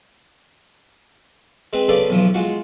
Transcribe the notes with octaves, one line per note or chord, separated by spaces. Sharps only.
G#3 C4 B4
C#3 B3 G#4 A4 D5
B1 E3 F3
G#3 F4 F#4 F#5